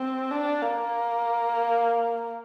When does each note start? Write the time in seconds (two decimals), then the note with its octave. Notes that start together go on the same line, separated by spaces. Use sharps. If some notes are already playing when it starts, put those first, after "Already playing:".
Already playing: C4
0.30 D4
0.62 A#3